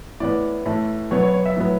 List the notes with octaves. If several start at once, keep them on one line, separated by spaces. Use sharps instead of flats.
A2 E3 B3 D5
A2 E3 A3
B2 F#3 B3 C#5
C#5
C#5
E5
A2 F#3 B3